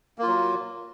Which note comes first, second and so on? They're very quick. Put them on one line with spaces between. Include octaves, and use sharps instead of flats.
A#3 F4 F#3